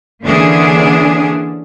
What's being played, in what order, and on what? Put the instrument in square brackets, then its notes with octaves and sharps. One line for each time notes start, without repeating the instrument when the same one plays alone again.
[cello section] D3 E3 A#3 C#4 D4 G#4